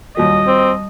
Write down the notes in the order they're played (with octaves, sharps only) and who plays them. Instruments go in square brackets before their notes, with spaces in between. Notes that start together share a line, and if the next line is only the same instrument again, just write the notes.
[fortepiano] D#2 A#2 F#3 [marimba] G3 [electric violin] D#5
[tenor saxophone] C4